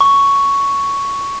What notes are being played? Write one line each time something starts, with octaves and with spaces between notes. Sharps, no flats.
C#6